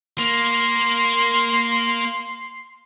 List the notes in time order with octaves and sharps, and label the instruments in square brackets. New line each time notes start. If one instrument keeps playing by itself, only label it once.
[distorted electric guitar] A#3 [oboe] C6